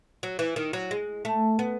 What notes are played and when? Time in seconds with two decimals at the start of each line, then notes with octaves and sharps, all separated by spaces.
0.23 F#3
0.39 E3
0.56 D#3
0.73 F#3
0.91 G#3
1.25 A3
1.59 B3